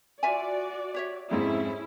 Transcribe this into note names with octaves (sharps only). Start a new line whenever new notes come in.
F4 F#4 D5 E5 G#5
G4 C#5 E5
F2 G#2 C#4 E4